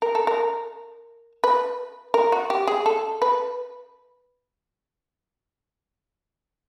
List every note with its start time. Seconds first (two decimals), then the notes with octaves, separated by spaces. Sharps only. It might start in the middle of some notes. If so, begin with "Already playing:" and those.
0.02 A#4
0.15 A4
0.27 A#4
1.44 B4
2.14 A#4
2.32 F#4
2.50 G4
2.67 G#4
2.86 A4
3.22 B4